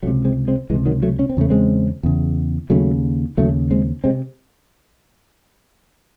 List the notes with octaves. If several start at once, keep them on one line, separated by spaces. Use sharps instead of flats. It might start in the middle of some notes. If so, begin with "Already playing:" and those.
C#2 C3 F#3 A3
G#3 C4
G#3 C4
C#2 C3 E3 G#3
D#3 F#3
F#3 A3
C#4
C4
E2 C#3 A3
G#3 C4
E2 C#3
D#2 C#3 F#3 A3
D#2 C#3 F#3 A3
G#3 C4
C3 G#3 C4